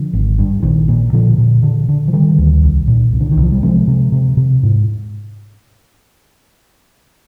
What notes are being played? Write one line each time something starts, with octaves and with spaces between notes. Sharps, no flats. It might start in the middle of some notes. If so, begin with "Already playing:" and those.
Already playing: D3 F3
G#1
G2
A#1 D#3
A#2
A#2 D3 F3
A#2
D3
D3
F3
D3 D#3 G3
D2
C2
A#2
C2
D3
D#3
C2 F3
G3
C3 F3 G#3
C3
C3
C3
G#2